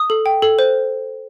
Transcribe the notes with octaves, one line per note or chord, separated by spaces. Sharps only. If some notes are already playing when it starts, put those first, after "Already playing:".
Already playing: D#6
A4
G5
A4
C5